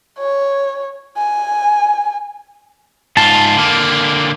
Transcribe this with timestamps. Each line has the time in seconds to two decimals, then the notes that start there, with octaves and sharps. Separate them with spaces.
0.19 C#5
1.17 G#5
3.17 G#2 F4 A5
3.57 D3 A#3